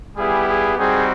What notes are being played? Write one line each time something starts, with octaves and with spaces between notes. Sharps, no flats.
G3 B3 E4 G4 G#4
G#4
G3 C4 D#4 F#4 G#4